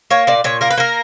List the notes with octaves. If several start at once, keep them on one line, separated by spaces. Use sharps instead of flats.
A#3 C#5
A#2 D5
A#2 C#5
A#3 A#4
B4
A#3 A#4